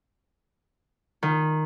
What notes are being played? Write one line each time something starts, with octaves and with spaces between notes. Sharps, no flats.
D#3